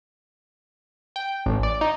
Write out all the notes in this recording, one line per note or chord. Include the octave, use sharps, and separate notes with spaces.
G5
A1
D5
D#4